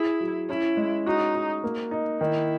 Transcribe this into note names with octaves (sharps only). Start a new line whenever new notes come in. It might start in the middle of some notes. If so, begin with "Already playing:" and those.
Already playing: E4 G#4
F#3
C#4 E4
G#3
D#4 F#4
F#4
A#3
D#4
D#3 E4